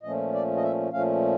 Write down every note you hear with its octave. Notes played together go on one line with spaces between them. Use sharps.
A#2 F3 A3 C#4 D#5
D5
D#5
E5
A#2 F3 A3 C#4 F5